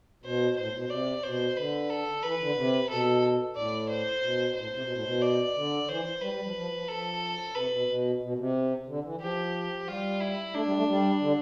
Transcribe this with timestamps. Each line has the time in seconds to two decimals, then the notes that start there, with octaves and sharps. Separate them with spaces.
0.24 B2 C5
0.57 A2 C5
0.73 B2
0.90 C3 D5
1.23 B2 C5
1.57 D3 B4
1.90 A4
2.23 E3 B4
2.40 D3
2.56 C3
2.89 B2 A4
3.56 A2 D5
3.89 C5
4.22 B2
4.55 A2 C5
4.72 C3
4.83 B2
4.93 A2
5.03 B2
5.22 D5
5.56 D3
5.88 E3 C5
6.21 G3 B4
6.33 G3
6.44 F3
6.55 F3
6.72 F3
6.88 F3 A4
7.55 C3 B4
7.72 B2
7.88 B2
8.22 B2
8.38 C3
8.88 D3
9.04 E3
9.21 F3 G4
9.82 F3
9.87 G3 F4
10.20 E4
10.54 A3 D4
10.65 G3
10.76 A3
10.87 G3
11.21 D3